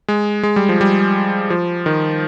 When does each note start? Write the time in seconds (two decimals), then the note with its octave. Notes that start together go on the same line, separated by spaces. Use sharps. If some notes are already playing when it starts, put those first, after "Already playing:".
0.08 G#3
0.43 G#3
0.56 G3
0.69 F3
0.81 G3
1.50 F3
1.86 D#3